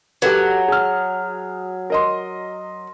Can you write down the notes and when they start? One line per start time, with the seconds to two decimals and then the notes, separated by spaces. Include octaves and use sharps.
0.22 F#3 G4 A4 B4
0.68 G#4 F6
1.90 A#4 D#5 C6